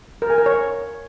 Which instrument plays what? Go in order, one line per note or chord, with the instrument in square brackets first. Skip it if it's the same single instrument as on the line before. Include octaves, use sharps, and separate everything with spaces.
[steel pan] A#4
G#5
A#4
C#5